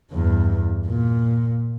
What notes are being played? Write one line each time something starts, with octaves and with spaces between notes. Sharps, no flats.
E2 G2
A#2